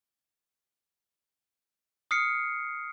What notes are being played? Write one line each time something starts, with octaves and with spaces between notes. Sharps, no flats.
D#6 F6 C7 C#7